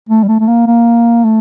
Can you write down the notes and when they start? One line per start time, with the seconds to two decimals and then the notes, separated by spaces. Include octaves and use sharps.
0.09 A3
0.24 G3
0.28 A3
0.40 A3
0.48 A#3
0.67 A#3
1.24 A3